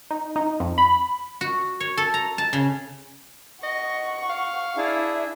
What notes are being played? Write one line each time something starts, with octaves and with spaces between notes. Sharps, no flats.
D#4
D#4
F2
B5
F#4
C#5
A4
A#5
A5
C#3
D#5 F#5 C#6
F5
D4 E4 G#4 E5